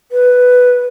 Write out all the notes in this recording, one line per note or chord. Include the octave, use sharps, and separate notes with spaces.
B4